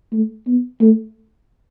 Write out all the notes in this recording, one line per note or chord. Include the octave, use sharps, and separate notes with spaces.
A3
B3
A3